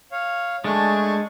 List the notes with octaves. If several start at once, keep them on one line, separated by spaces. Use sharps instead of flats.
C#5 F5
G#3 A3 D4 G#5 C#6